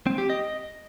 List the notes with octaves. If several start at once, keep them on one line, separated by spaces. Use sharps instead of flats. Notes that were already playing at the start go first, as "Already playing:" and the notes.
C4
G4
D#5